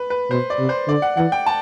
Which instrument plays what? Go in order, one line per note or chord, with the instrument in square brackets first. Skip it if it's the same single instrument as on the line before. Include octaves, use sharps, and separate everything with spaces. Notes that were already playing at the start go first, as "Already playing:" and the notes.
Already playing: [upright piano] B4
B4
[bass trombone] B2 [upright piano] C5
[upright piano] D5
[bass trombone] C3
[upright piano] C5
[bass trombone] D3 [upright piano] D5
[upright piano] F#5
[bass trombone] E3 [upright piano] F#5
[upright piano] G5
A5